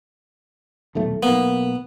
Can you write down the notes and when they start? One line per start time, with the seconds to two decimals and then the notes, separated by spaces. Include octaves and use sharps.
0.95 D#1 B1 A3
1.23 B1 A#3 B3